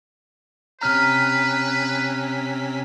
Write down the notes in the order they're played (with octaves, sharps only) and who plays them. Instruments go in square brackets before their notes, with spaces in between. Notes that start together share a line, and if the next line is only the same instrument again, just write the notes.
[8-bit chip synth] C3 C#4 B6 [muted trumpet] B4 [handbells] A#5 F6